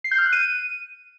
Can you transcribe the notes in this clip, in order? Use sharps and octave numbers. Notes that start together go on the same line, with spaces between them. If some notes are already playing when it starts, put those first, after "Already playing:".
C7
G6
F6
F#6
D#7